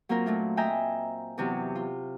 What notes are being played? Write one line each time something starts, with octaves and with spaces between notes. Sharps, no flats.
F#3 A#3 C4 F4 A#4
A#2 A3 D4
C5 D#5 E5 G5 G#5 A#5
E2 C3 F#3
F4